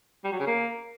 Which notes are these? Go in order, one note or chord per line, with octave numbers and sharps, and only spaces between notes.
G3
F#3
C#3
A#3